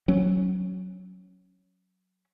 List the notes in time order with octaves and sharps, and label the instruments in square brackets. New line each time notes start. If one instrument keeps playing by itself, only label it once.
[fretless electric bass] F#3 C#4